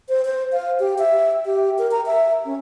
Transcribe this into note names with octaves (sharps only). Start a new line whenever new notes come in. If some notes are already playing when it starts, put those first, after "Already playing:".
C5
C5
F5
G4
E5
G4
A#4
A#5
E5
C#4